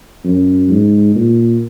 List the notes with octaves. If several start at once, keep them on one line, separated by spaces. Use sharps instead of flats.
F#2
G#2
A#2